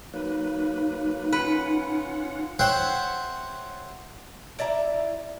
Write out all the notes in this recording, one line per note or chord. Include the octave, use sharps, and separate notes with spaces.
F#3 A#3 D#4 B4
C#4 F4 B4 F#5
C5 C#5 E5 F#5 G5 C#6
E4 D5 E5 A#5